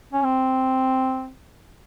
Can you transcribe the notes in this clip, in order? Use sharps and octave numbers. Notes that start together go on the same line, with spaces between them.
C#4
C4